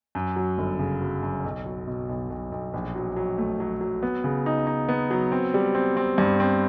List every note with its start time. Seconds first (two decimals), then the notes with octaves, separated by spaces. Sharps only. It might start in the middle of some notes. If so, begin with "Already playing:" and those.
0.15 F#2
0.36 F#3
0.58 G1
0.79 C#3
1.01 F#3
1.23 F#2
1.44 B1
1.66 F#3
1.87 B2
2.09 B1
2.30 B1
2.52 B1
2.74 A#1
2.95 F#3
3.16 F#3
3.38 A3
3.60 F#3
3.81 F#3
4.03 B3
4.24 C#3
4.46 D#4
4.67 D#4
4.89 B3
5.10 F#3
5.32 C4
5.54 G3
5.75 C4
5.97 C4
6.18 G2
6.40 C4